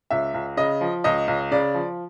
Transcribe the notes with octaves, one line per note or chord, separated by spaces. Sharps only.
C#2 E5
C#2
C#3 D#5
F3
C#2 D#5
C#2
C#3 D5
F3